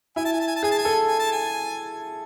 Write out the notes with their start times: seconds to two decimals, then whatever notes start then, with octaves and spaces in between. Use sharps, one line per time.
0.16 E4 G#5
0.25 A5
0.33 G#5
0.40 A5
0.47 G#5
0.56 A5
0.63 G#4 G#5
0.71 A5
0.78 G#5
0.85 A4
1.08 G#5
1.19 A5
1.32 G#5